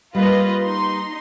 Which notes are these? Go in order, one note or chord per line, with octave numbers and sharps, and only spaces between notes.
G3 A#3 F4 B4 D#5
D#4 C6